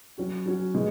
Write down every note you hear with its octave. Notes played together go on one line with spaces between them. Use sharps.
F#3 C#4 F#4
F#3 C#4 F#4
B2 G#3